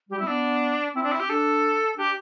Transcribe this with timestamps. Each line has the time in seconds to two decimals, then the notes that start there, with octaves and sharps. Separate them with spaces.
0.10 G3 G4
0.19 C4 E4
0.27 B3 D4
0.95 C4 E4
1.03 D4
1.12 E4
1.20 G4
1.29 D4 A4
1.97 D4 G4